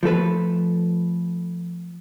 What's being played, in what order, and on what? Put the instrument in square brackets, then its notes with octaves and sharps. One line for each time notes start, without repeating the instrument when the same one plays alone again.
[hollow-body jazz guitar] F3 A3 A4 B4